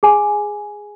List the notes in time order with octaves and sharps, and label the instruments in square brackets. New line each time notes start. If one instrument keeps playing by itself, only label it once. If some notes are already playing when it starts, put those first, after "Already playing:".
[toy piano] G#4 G#5